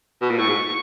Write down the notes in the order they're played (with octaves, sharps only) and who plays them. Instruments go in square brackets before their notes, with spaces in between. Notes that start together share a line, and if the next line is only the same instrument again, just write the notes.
[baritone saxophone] B2
A#2
[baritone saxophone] A2 [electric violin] C#6
[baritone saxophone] G#2